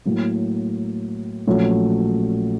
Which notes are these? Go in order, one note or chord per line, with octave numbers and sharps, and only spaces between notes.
A2 F#3 A#3
A#1 A#2 F#3 A3 C#4